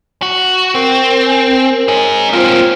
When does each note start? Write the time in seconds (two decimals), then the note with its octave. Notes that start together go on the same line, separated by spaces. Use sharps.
0.22 F#4
0.75 C4 A#4
1.26 A#4 G#5
1.88 D#4 G#4 C#5
2.33 A#3 C4 F4 C5